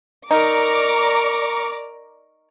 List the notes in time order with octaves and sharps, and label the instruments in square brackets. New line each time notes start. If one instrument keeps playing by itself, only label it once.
[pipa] D#4 [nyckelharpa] A#4 C#6 [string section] D5 A#5 D6